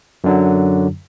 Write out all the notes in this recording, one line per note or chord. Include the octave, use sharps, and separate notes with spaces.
F#2 D3 F#3